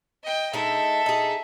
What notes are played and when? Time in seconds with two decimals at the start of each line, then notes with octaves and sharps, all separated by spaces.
0.23 D#5 G5
0.54 G#3 D#4 A4 E5
1.06 D#4 G#4